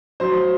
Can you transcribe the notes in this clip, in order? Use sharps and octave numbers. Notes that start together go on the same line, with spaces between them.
F#3 C5